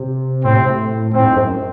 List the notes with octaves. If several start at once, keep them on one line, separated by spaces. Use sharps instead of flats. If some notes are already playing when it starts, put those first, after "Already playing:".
Already playing: C3
A2 C4
C3
A2
A2 C4
G#2
F#2